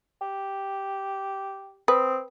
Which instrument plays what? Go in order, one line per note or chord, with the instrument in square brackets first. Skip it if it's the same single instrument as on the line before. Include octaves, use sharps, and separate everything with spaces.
[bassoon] G4
[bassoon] C4 [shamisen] B4 [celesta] D#6